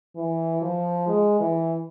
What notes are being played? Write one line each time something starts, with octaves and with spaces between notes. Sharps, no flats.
E3
F3
G#3
E3